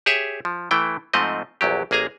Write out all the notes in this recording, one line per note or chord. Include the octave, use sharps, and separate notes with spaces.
G4 G#4 C#5 E5
F3
E3 A3 E4 G5
G#2 F3 A3 C4 D#5
A#1 E2 F#3 G4
A1 A#3 G#4 G#5 A#5